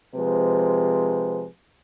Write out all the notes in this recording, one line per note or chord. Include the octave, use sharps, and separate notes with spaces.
C3 F3 G#3 B4